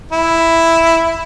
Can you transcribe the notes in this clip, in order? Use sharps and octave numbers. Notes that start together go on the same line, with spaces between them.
E4